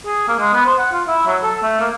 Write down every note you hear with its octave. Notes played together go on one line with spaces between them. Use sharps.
G#4
A#3
G#3
B3
C5
F#5
F4
E4
F#3
A4
A3
A#3